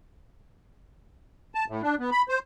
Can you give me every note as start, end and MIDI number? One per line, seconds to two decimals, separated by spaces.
1.55 1.65 81
1.68 1.82 45
1.82 1.95 62
1.99 2.10 59
2.12 2.22 83
2.29 2.39 72